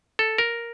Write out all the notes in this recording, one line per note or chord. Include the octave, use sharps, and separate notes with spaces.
A4
A#4